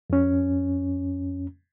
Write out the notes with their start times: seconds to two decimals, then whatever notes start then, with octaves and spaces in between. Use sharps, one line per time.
0.10 F2 C#4